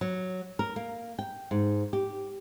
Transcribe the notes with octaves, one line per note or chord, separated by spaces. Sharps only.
F#3
A#4
A#3
G5
G#2
G4